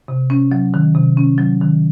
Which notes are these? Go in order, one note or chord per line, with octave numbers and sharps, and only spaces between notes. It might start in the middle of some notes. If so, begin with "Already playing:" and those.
C3
C#4
F#3
D#3
C3
C#4
F#3
D#3